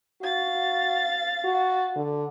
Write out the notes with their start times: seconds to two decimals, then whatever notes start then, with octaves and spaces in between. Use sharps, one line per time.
0.22 F#4 F5 A6
1.45 F#4
1.96 D3